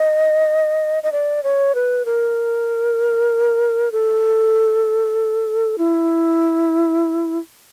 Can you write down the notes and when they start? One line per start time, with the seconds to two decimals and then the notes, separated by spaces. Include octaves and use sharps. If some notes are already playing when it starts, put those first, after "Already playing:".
Already playing: D#5
1.03 D#5
1.12 D5
1.43 C#5
1.75 B4
2.06 A#4
3.92 A4
5.78 E4